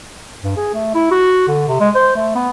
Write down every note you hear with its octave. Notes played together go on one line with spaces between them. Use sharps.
G2
G#4
A3
E4
F#4
D3
C3
G#3
C5
A3
B3